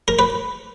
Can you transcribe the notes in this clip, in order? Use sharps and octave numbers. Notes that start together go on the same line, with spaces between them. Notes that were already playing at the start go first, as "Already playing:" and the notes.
A#4
B4